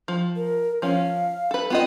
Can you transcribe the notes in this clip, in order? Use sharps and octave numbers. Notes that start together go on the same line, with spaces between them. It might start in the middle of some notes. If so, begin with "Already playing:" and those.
F3
A#4
F3 C#4 F5
A4 B4
B3 C4 F4 D#5